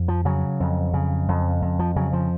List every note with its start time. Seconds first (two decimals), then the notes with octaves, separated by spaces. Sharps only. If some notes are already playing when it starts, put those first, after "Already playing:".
Already playing: F2
0.08 F3
0.25 C#3 F#3
0.60 F2
0.94 C#3
1.28 F2
1.62 F2
1.79 F3
1.96 C#3 F#3
2.13 F3